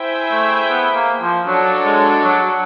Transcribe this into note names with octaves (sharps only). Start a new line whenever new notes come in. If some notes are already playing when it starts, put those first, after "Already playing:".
Already playing: E4 G#4 C5 E5 G5
A3
B3
A#3
F3
F#3 D4 F#4 A4 C#5
G#3
F#3
F#3